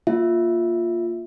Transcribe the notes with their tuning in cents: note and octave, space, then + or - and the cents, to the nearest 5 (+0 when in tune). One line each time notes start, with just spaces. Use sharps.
A#3 +0 F4 +0 E5 +0